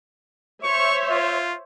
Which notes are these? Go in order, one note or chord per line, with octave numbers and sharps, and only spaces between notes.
C5 C#5 E5 C#6
F4